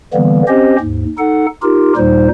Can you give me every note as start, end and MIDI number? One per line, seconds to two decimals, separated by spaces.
0.14 0.42 50
0.14 0.42 52
0.14 0.42 55
0.14 0.42 58
0.14 0.42 59
0.48 0.76 60
0.48 0.76 61
0.48 0.76 67
0.48 0.76 72
0.48 0.76 75
0.80 1.05 39
0.80 1.05 44
1.18 1.46 63
1.18 1.46 69
1.18 1.46 78
1.63 1.93 63
1.63 1.93 65
1.63 1.93 67
1.63 1.93 70
1.97 2.28 39
1.97 2.28 46
1.97 2.28 55
1.97 2.28 63
1.97 2.28 72